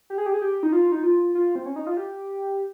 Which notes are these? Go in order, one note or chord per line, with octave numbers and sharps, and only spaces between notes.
G4
G#4
G4
G#4
G4
D#4
F4
D#4
F4
F4
C4
C#4
D#4
F4
G4